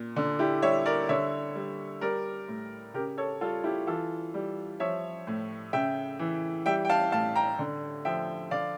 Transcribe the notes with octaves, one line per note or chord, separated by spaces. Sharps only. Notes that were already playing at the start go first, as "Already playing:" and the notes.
Already playing: A#2
D3
E4 G4
G3 C#5 E5
A#4 D5
D3 C#5 E5
G3
G3 A#4 D5
A2
C#3 G4 A#4
A4 C#5
G3 F4 A4
E4 G4
E3 F4 A4
G3
F3 C#5 E5
A2
C#3 E5 G5
E3
G3 E5 G5
G5
F5 A5
A2 F5 A5
G5 A#5
D3
F3 E5 G5
D3 D5 F5